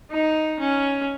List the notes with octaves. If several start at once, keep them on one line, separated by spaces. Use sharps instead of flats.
D#4
C#4